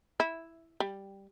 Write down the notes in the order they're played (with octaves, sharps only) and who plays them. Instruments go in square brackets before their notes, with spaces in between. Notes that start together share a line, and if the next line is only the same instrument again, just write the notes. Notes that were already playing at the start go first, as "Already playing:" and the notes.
[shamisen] E4
G3